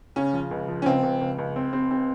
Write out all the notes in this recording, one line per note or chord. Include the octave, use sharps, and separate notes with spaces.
C#3 C#4
F3
C#2
F3
C#4
C#2 C4
C#2
C#2
C#2
C4
C4
C4